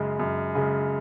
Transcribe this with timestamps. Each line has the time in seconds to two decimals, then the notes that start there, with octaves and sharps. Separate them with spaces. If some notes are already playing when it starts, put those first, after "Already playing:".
Already playing: F#2 C#3 G#3
0.20 F#2
0.55 C#3 G#3